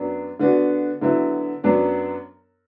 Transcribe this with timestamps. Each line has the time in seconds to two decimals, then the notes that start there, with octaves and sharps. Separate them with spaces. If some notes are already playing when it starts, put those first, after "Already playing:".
Already playing: F#2 F#3 B3 D4
0.40 D3 B3 D4 F#4
1.01 D3 F#3 B3 E4
1.64 F#2 F#3 B3 D4